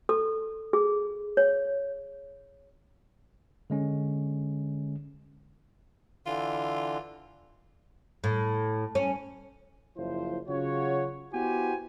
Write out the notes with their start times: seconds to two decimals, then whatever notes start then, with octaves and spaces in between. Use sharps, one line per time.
0.09 A4
0.73 G#4
1.37 C#5
3.70 D3 G#3 C#4
6.26 D3 E3 F4
8.24 A2
8.95 C#4
9.97 F#1 F3 E4 C5
10.48 C#3 F#3 F4 F#4 C#5
11.33 B3 E4 F#4 G4 C5 G#5